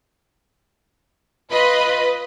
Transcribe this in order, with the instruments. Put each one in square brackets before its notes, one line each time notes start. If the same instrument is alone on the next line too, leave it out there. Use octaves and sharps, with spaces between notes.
[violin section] F4 D#5 B5 [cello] B4